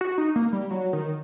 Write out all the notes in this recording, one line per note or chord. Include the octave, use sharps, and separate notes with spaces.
F#4
D#4
A#3
G3
F#3
D#3